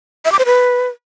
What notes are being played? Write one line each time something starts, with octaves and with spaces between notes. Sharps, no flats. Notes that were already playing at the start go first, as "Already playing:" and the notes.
E5
D6
C5
B4